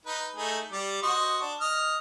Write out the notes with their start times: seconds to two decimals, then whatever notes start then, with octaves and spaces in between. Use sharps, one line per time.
0.06 D#4 B4
0.36 A3 D#4 G#4
0.72 G3 D6
1.03 F#4 C5 D#5
1.42 D4
1.61 D#5 F6